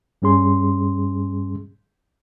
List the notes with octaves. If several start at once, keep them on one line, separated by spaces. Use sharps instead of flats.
G2 G3 C#4 G#4 C6